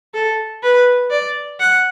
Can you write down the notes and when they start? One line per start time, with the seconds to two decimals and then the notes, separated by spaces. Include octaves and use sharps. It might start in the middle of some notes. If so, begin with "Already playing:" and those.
0.14 A4
0.63 B4
1.10 D5
1.60 F#5